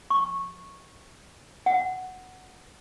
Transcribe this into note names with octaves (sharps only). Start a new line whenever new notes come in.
C#6
F#5